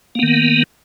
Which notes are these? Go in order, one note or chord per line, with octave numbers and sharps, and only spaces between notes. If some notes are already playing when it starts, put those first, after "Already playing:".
D#3 A#3 B3